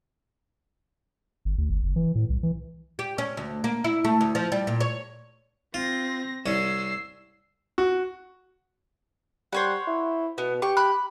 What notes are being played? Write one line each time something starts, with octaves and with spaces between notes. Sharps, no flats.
G1
D2
G1
F#1
E3
A2
C2
E3
G4
C#4
D2
A#3
E4
A3
D2
F3
G3
A#2
C#5
C4 F4 A#6
C2 C#4 E6 C7
F#4
G3 C5 C#5 F#5
E4
B2 B3
G4 C#6
B5 F#6